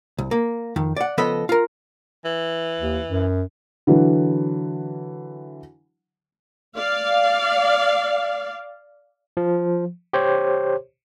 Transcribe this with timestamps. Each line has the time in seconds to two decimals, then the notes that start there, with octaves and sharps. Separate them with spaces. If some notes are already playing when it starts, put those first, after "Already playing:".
0.18 C2
0.31 A#3
0.76 F2 D#3
0.96 D5 F#5
1.18 C#3 F3 B3 A4 D#5 B5
1.49 F4 A#4
2.25 E3
2.79 D#2
3.08 F#2
3.87 D3 E3 F#3
6.77 D5 F5
9.37 F3
10.13 G4 C5 C#5